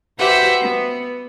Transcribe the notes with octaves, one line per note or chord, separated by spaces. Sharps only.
F#4 G4 B4 C5 E5 F#5
B3